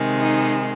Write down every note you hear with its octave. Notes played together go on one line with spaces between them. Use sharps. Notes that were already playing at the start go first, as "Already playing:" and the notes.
Already playing: C3 D#3 G#3
D#4